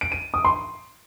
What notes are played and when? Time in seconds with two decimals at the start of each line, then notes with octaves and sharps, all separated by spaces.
0.01 D7
0.12 D#7
0.34 D#6
0.45 C6